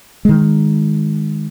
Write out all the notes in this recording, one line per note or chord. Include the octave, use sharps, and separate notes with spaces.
D#3 G#3